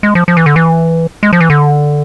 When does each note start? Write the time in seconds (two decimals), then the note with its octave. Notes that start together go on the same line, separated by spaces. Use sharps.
0.03 G#3
0.15 F3
0.28 F3
0.37 E3
0.46 D3
0.56 E3
1.23 G#3
1.33 F3
1.40 E3
1.50 D3